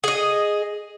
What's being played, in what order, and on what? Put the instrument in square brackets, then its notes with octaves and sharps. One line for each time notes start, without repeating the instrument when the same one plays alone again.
[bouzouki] G#4 D#5